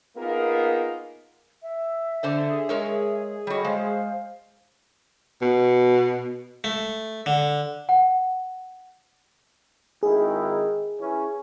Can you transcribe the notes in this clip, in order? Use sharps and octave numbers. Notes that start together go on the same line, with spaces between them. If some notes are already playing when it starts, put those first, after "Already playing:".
A#3 B3 D#4 F4 G#4 A#4
E5
D3 C5 D5
G#4
G#3 A#4 C#5
G3 F#4 A4 C#5 D#5
G#3 C5 F5
B2
A3
D3
F#5
G#1 D#3 E4 G#4
E3 C#4